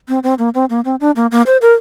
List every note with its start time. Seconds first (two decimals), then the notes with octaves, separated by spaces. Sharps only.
0.08 C4
0.23 C4
0.39 A#3
0.54 C4
0.70 A#3
0.85 C4
1.00 D4
1.16 A#3
1.31 A#3
1.46 C5
1.62 A#4